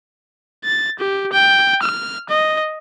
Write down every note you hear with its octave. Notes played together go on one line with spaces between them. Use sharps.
A6
G4
G5
F6
D#5